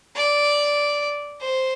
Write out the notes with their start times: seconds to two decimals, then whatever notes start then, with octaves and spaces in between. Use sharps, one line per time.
0.16 D5
1.41 C5